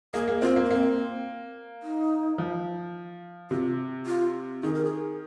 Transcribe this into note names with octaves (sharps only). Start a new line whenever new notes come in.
A#3 G#4
A#3
C4 F4
A#3
D#4
A#3 C4
D#4
F3
C3 F4
F4
D#3 G#4
A#4
G#4